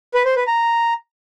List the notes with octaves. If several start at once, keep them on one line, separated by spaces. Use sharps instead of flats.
B4
C5
B4
A#5